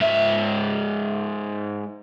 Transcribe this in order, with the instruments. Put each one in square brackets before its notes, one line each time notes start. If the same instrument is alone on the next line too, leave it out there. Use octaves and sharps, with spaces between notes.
[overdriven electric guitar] G#2 E5